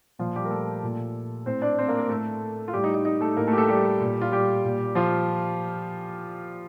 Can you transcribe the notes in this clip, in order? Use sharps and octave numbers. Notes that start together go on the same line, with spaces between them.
A#2 F3 F4
G3 G4
A#4
A3 A4
A#2
A2 C4 C5
D4 D5
C4 C5
A#3 A#4
A#3 A#4
A2 A3 A4
F4
A2 G3 G4
D#4
D#4
D#4
A3 A4
A2 A#3 A#4
A3 A4
G4
A3 A4
G3 G4
A#2
F4
G3 G4
A#2
F3 F4